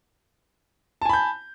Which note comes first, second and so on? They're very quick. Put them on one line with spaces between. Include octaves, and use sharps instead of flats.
A5 G#5 B5 G6